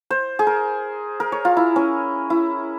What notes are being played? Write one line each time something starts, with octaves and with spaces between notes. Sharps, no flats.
C5
G#4
A#4
A#4
C#5
F4
E4
C#4
E4